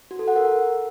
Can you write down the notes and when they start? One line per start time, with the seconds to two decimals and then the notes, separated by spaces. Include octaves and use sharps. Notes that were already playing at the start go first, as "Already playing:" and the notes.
0.11 F#4
0.19 A4
0.28 F#5
0.36 A#4